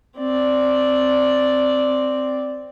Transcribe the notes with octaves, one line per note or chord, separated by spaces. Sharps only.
C4 D5